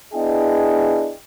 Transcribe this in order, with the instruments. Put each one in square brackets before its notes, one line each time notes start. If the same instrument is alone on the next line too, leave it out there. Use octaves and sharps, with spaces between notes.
[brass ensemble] B3 D4 E4 G#4 D#5 G5